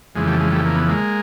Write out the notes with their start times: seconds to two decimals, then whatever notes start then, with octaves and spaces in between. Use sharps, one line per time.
0.15 F2 C#3 E3 G#3
0.27 G3 A3
0.40 G#3
0.52 G3 A3
0.65 A#3
0.76 B3
0.88 G#3 A#3